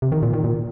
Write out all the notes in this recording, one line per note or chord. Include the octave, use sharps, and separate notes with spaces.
C3
D#3
A#2
D#3
A#2